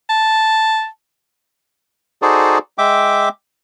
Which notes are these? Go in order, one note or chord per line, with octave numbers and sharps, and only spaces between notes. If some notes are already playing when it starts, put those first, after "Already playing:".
A5
D#4 F#4 G#4 A4 C5 D5
G#3 E5 G5 D6